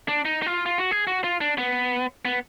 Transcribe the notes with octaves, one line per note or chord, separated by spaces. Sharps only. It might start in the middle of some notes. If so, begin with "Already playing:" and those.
D4
D#4
D#4
F4
F4
F#4
G#4
F#4
F4
D4
B3
B3